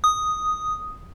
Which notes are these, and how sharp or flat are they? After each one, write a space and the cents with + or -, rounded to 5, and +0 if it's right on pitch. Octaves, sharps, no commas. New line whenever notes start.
D#6 +0